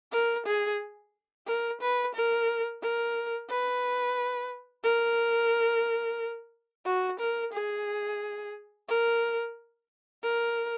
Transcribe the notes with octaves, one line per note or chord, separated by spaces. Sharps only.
A#4
G#4
A#4
B4
A#4
A#4
B4
A#4
F#4
A#4
G#4
A#4
A#4